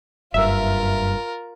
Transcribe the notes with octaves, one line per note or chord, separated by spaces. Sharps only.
F#1 G2 F4 A#4 E5